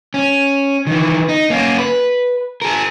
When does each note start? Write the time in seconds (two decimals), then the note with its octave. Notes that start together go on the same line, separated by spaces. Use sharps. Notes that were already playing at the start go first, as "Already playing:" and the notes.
0.14 C#4
0.87 D#3 E3
1.29 D#4
1.50 A#3 C#4
1.78 B4
2.62 G#4 A#4